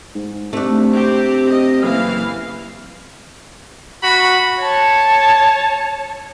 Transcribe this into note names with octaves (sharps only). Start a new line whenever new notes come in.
G#2
C3 A3 D4
C4 G4
D#5
F#1 E3 F5
F#4 B5
C#5 A5